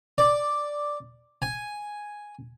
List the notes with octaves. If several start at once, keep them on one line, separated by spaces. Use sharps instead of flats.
D5
G#5